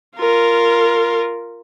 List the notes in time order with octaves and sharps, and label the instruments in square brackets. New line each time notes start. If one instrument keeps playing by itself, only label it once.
[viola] F4 A#4